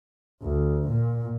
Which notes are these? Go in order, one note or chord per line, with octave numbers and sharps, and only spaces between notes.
D2
A#2